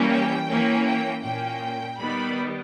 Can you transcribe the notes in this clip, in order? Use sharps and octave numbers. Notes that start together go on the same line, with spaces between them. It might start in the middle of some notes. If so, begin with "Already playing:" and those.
Already playing: E3 G3 A#3 C#4
G5
E3 A#3 C#4
G5
A#2 A#3 C#4 G5
D#3 G3 B3 B5